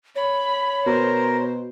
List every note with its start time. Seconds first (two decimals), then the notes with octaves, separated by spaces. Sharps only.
0.15 C#5 B5
0.86 B2 A#4 C5